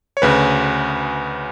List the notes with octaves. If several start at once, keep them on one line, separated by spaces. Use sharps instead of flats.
C#5
D2 C#3 B4